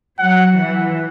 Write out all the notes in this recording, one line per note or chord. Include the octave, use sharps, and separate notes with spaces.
F#3 F#5
E3